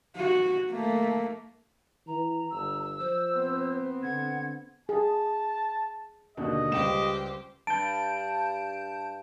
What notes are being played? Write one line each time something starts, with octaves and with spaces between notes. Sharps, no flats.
F#4
A3 A#3
E3 A#5
G1 E6
F3 C5
B3 C4
D3 F#5 G#6
G#4 A5
D#2 B2 D3 D#5
C#2 G3 G4 C5 E7
G2 A5 G6 D7